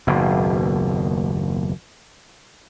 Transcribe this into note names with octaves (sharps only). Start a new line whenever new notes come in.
F#1 D#2 B2